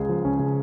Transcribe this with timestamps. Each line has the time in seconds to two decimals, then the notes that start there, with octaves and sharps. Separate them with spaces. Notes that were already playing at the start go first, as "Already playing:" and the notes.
Already playing: C#2 C#3 G#4
0.09 F3
0.25 C#2 C#4
0.40 C#3